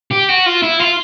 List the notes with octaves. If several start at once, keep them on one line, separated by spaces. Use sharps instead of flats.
G4
F#4
F4
E4
F4